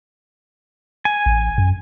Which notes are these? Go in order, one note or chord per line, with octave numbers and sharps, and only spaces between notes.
G#5
A1
F#2